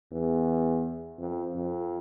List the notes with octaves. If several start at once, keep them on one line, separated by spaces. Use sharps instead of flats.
E2
F2
F2